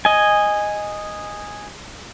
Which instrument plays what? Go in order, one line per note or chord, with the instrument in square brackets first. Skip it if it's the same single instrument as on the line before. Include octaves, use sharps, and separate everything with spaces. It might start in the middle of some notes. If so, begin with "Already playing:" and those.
[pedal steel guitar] D#5 G#5